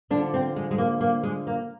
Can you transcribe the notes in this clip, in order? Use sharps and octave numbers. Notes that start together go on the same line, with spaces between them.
D3 F3 D4
C4
G#3
G#3
A#3
A#3
G#3
A#3